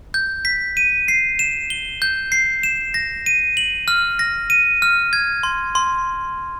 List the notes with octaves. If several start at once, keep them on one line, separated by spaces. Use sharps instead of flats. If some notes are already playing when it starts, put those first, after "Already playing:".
G6
B6
D#7
C7
E7
G7
G6
C7
E7
A#6
D#7
F#7
F6
A#6
D#7
F6
G#6
C6
C6